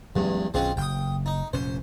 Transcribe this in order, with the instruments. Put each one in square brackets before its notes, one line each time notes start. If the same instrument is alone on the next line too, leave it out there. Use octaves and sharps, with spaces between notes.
[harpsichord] E2 G2 [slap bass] F#3 G#3 C#4
[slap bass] B1 B2 C#4 [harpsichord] G#3 C4 F4
[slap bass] F#1 [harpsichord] G5 D#6
[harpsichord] D#4
[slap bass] F1 A#2 C#4 [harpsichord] C5